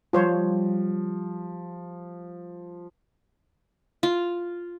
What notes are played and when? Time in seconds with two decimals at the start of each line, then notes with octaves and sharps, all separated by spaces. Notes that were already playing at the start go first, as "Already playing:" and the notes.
0.13 F3 G3 F4 C5 C#5
4.03 F4